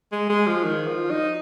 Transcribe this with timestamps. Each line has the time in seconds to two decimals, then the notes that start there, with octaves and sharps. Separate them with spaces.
0.12 G#3
0.30 G#3
0.47 F3
0.64 D#3
0.88 F3
1.11 D#4